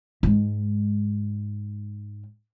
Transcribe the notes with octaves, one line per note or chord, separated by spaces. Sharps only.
G#2 G#3